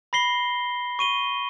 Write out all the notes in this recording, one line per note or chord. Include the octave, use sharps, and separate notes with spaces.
B5 A#6 C7 G7
C#6 D#7 G7